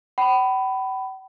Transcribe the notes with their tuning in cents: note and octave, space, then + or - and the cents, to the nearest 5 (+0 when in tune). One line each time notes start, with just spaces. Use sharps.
G5 -45 B5 +10